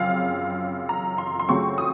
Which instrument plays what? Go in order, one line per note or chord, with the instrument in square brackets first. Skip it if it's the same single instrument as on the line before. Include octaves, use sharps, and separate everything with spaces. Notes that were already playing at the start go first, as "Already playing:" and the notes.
Already playing: [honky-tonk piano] F#2 C#3 F3 C4 F5
A#5
C6
C6
C#3 F#3 A3 C4 F4 C#6
D#6